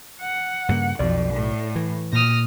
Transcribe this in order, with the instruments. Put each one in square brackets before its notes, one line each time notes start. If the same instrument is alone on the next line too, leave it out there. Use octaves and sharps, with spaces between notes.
[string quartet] F#5
[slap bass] G2 C#3 A#3
[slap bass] B1 [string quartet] F2 [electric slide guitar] D5
[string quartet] A2
[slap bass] E3
[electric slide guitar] A#2 [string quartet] D#6 F6 A#6